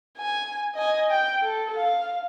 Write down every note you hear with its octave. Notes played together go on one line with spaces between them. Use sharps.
G#5
D#5 G#5
G5
A4
F5